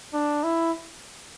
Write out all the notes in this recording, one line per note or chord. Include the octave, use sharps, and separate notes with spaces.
D4
E4